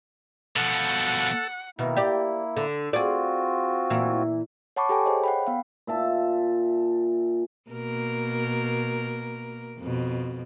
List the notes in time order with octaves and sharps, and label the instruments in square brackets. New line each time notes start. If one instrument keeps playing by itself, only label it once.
[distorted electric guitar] B2 F3 [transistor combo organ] A4 [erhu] F#5
[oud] B2 D#3 [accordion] A#3 E4
[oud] G4 D5
D3
[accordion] C4 F4 F#4 [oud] G#4 D5
[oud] A#2 E3
[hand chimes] C#5 F#5 A5 B5 C#6 D6
G4 A4 G5 G#5
G#4 C5 C#5 D#5
F#5 G5 B5
B3 F5
[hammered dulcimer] A#2 E5 A5
[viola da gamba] B2 A#3 A#4
F2 B2